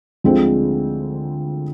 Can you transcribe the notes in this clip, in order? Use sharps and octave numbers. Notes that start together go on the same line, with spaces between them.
D2 D3 F3 G#3 C4